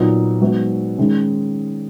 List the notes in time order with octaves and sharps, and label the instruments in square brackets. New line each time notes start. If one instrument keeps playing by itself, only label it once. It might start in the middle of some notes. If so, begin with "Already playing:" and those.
Already playing: [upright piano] A#2 F#3 B3 D#4 F#4
G#2 F#3 B3 F#4
G#2 D#3 G#3 C#4